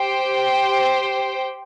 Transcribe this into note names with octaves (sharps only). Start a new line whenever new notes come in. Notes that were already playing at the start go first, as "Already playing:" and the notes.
Already playing: G4 C5 G5